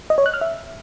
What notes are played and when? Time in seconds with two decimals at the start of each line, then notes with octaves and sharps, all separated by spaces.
0.10 D#5
0.18 C#5
0.26 F#6
0.34 F6
0.41 E5